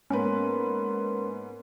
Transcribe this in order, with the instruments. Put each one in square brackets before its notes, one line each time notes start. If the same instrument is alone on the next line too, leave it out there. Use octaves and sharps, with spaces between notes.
[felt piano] G#2 B3 B4 [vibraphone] A#3 A#4 C6 [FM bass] C#4